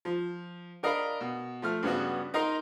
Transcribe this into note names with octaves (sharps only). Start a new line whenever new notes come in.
F3
D4 A#4 D#5 F5 A#5 B5
B2
F3 A3 F6
G2 C#3 B3 F#4
D#4 A#4 D#5 A#5 C6